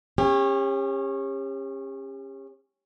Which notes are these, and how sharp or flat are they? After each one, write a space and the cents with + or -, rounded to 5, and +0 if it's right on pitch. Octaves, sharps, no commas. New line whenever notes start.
C#4 -25 G4 +40